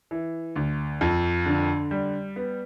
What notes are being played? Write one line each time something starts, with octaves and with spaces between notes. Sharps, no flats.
E3
D2
F2
D3
G3
B3